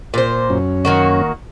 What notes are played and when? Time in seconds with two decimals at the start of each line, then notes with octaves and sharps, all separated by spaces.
0.14 A#2 C5
0.50 F#2 C#4
0.85 D#3 A#3 F#4